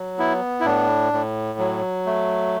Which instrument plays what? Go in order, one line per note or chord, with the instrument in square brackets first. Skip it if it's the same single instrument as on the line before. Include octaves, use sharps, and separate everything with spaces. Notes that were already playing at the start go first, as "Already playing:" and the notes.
Already playing: [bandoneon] F#3
B3 E4
E4
A2 D4
A2
F#3
A3